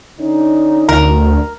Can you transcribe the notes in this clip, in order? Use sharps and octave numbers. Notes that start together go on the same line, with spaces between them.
D3 C#4 D#4
D2 A#4